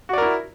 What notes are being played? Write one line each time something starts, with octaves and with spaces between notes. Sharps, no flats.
E4 F#4 A#4 D5